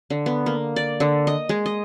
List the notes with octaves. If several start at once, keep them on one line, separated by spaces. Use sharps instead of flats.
D3
B3
A#3
D5
D3
D#5
G#3
D#5